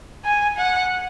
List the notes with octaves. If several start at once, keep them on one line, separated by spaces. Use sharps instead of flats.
G#5
F#5